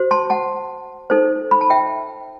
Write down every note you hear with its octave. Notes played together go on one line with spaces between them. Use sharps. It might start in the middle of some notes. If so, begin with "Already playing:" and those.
Already playing: F#4 C5
A5 C6
F#5 A5
D#4 A4 C5
B5
A5
E5 G5